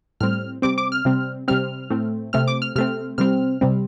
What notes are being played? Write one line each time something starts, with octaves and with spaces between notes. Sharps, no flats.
A2 G3 C4 F6
C3 G3 C4 D6
D6
F6
C3 G3 C4
C3 G3 C4 F6
A2 A3 C4
C3 A3 C4 F6
D6
F6
C3 A3 C4 F6
C3 G3 C4 F6
C3 G3 C4